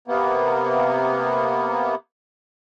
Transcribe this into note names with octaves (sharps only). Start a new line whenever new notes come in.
C3 A#3 B3